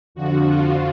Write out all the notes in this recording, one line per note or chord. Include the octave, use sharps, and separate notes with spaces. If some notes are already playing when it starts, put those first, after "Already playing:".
F2 D3 F3 F#4
F4